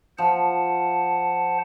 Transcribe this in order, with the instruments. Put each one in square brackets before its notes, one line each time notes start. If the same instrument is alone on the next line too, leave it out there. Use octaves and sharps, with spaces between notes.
[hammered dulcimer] F3 [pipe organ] C5 F#5 A5